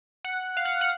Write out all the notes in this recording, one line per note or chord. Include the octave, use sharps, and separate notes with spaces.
F#5
F5
F#5
F#5